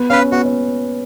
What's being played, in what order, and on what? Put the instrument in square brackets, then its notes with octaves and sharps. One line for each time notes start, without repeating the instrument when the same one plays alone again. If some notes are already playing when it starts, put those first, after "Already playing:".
Already playing: [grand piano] B3
[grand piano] C#4 [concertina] B4 F5
[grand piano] B3 [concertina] F#4
[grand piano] C#4